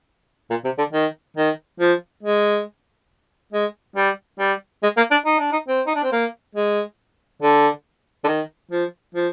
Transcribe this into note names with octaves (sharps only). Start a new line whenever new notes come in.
A#2
C3
D3
D#3
D#3
F3
G#3
G#3
G3
G3
G#3
A#3
D4
D#4
D4
D#4
C4
D#4
D4
C4
A#3
G#3
D3
D3
D#3
F3
F3